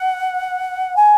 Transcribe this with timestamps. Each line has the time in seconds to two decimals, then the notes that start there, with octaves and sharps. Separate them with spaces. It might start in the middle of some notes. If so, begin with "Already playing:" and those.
Already playing: F#5
0.96 G#5